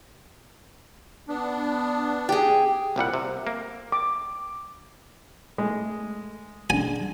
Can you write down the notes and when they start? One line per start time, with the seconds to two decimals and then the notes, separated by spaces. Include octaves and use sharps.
1.29 B3 D4
2.29 G4 G#4
2.96 C2 A#2 G3 F#5
3.14 C3
3.47 A#3
3.92 D6
5.58 G#3 A3
6.70 D3 G#3 D4 G#5